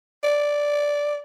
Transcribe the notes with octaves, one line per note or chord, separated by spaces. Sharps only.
D5